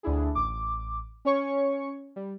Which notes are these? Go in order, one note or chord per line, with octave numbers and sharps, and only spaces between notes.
D2 D4 E4 G#4
A1 D6
C#4 C#5 C#6 C#7
G3